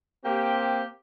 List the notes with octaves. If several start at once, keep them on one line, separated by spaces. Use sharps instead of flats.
A#3 C4 G4